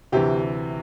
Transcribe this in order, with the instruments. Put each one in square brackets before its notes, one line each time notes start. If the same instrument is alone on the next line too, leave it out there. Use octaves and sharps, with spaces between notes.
[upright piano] D2 C3 E3 G4